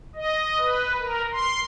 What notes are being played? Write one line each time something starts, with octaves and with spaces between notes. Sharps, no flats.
D#5
B4
A#4
C6